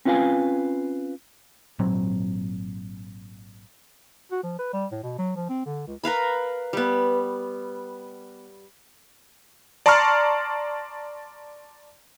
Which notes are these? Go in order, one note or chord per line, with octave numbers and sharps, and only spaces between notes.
C4 C#4 F4 B4 F5 G#5
G#1 A#2 F#3 C4
F#4
F3
B4
G3
A2
B2
F#3
F3
C4
D3
C#2
A#4 B4 F5 B5
G3 B3
D5 A5 A#5 C6 C#6 F6